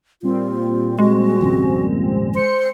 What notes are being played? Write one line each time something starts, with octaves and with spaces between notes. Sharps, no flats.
A#2 G3 C4 F4
G#3 F#4
G#1 F2 C#3
C5 C6 C#7